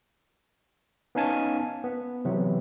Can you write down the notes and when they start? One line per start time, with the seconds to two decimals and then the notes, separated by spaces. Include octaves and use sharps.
1.15 B3 C#4 D#4 F5 G#5 A5
1.84 B3
2.25 C3 E3 F#3 B3